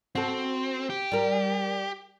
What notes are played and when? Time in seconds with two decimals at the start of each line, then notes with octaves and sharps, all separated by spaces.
0.15 C4 F#4 A4
0.90 G4
1.12 G3 A#4